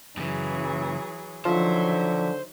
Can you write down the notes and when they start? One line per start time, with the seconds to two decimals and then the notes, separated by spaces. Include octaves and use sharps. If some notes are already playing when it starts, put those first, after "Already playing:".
0.17 F#2 C#3 E3 F#3 G#4
1.45 D3 D#3 F3 F#3 C5 E5